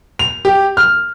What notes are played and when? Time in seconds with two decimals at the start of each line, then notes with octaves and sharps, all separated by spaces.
0.19 F7
0.45 G4
0.77 F6